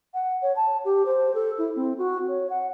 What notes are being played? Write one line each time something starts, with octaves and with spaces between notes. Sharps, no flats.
F#5
C#5
A5
G4
C5
A4
E4
C4
F#4
C#5
F#5